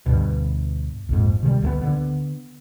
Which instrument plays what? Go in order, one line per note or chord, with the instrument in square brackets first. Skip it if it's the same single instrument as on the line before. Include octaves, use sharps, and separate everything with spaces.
[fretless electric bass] D2 G2 B2
A#1 F2 G#2
C3 D#3 F3 G3
D2 A3 B3
D3 B3